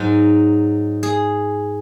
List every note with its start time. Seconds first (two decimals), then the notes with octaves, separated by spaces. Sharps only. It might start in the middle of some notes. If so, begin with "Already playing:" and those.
Already playing: G#2 F#3 D#4
1.03 G#4